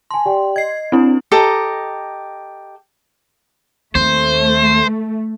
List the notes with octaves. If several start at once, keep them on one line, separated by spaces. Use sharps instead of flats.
G#5 A5 C6
G4 D5 G5
D#5 G#6 C7
C4 D4 E4 C#5
G4 A4 D#5 A#5
D#2 A3 C4 C5